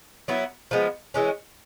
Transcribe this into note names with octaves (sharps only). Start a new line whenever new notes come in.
F#3 B3 E4
F3 G#3 B3
E3 G#3 C#4